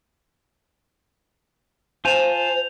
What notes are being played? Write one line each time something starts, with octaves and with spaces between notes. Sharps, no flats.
F4 C5 G#5 A5 G6 F7